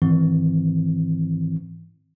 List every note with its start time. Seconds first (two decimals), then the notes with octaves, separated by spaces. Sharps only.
0.02 G#2 D#3 E3 C4